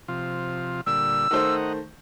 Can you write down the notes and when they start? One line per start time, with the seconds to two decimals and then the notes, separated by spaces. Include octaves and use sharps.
0.08 C3 F3 F4
0.86 A#2 D3 G3 E6
1.31 D#3 A3 C5 D#5 F#5 A#5